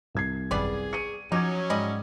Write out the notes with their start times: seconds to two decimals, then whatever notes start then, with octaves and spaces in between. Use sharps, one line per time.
0.15 C2 G#6 C7
0.51 G#1 F#2 G3 B3 G#4 D5
0.93 C#6 C#7 D#7
1.32 F3 F#3 C#4 D#4 D6 G#6
1.70 G#2 G3 G#4 D#5